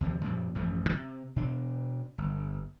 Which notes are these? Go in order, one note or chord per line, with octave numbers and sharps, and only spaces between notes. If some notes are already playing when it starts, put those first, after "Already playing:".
D#2 C3 F3
F#2 A#2 F3
A1 F#2 F3 A3
C3
B2 D4
G1